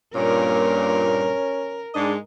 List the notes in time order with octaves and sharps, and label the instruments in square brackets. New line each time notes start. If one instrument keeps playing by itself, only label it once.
[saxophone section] G2 A#2 [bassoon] C#4 [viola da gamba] A#4
[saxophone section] G#2 G#3 D#5 [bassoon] D4